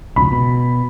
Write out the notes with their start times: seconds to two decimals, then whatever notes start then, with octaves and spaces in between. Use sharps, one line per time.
0.16 F1 C#2 B5
0.31 B2